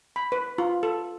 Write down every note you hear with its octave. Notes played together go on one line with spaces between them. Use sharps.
B5
B4
F4
A4